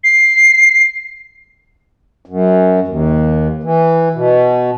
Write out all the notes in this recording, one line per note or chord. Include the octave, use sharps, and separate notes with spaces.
C7
F#2
D#2
E3
B2